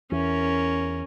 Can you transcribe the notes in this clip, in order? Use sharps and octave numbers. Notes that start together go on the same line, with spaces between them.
E2 C#4 A#4